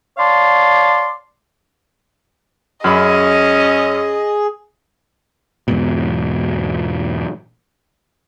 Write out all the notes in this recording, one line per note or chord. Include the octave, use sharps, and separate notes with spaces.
C#5 D5 F5 A5 C6
F#2 C#4 G#4 D#5 B5
E2 G#2 B2